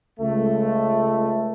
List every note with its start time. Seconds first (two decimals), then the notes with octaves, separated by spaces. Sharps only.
0.19 C#2 A3